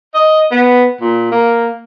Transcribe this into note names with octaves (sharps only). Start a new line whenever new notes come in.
D#5
B3
A#2
A#3